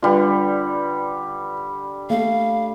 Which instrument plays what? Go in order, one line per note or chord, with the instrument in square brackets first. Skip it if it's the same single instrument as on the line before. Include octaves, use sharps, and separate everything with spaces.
[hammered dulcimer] D3 G3 [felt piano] F4 B4
[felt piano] A3 [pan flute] F5